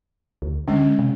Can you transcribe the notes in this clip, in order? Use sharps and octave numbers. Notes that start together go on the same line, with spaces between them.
D2
D3 G#3 C#4
C3